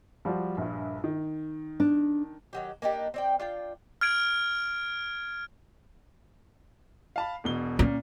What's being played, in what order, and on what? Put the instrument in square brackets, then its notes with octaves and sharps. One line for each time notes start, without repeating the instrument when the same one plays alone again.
[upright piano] F3 G3 F#4
A#1 G2
D#3
[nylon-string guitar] D4
[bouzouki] D#3 F#3 G4
A#3 D4 D#4 G4
C4 D5 G5
D4 F4 G5
[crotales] F6 G#6 D7
[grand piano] F5 A5 B5
E1 B2 G7
[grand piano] A#2 [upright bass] C#4